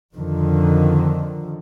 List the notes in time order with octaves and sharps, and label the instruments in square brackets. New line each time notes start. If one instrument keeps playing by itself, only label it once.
[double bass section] F2 D3 D#3 F3